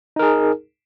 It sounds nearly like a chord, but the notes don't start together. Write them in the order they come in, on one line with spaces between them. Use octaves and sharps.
D#4 A#4 G#4